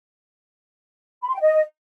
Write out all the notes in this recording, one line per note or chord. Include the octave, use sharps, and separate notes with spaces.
B5
C6
G5
D#5